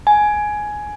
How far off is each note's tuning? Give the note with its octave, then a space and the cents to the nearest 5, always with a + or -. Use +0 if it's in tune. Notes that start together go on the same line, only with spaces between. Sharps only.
G#5 +10